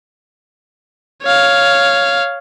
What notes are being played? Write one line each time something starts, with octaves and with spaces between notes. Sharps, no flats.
C#5 F5